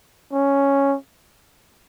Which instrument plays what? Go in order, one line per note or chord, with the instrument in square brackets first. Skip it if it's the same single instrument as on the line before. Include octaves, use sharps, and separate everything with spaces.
[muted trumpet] C#4